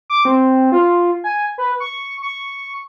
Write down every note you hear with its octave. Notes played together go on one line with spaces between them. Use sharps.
D6
C4
F4
G#5
B4
C#6
C#6